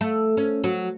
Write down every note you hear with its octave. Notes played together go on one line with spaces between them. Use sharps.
A3
C#4
F#3